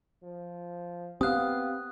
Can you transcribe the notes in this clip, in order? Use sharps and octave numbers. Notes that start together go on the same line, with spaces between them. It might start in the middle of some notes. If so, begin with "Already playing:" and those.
F3
B3 C4 G4 F5 D#6 F#6